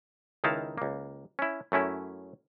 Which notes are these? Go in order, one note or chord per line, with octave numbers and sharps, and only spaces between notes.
C#2 D#3 D#4 E4 F5 A5
C#2 A#3
C#4 E4
F#2 A3 C#4 E4